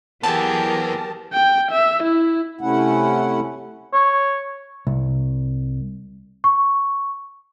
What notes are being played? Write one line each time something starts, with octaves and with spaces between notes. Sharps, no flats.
E3 F#3 B3 G4 G#4 A#4 A5
G5
E5
E4
C3 A3 C#4 E4 F#5
C#5
C2
C#6